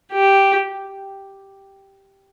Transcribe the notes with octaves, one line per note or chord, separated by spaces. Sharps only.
G4